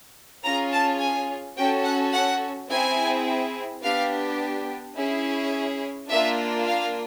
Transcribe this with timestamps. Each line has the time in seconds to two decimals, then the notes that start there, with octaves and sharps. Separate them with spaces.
0.43 C#4 F4 G#4 A#5
0.72 A5
1.00 G#5
1.57 C#4 F#4 A4 G5
1.85 F#5
2.13 F#5
2.70 C4 E4 G#4 G#5
3.83 B3 D4 G4 F5
4.96 C#4 E4 G#4
6.09 A#3 D4 F4 E5
6.66 F5